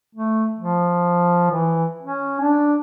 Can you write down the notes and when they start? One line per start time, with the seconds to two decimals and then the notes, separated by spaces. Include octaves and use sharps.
0.15 A3
0.59 F3
1.51 E3
2.02 C#4
2.40 D4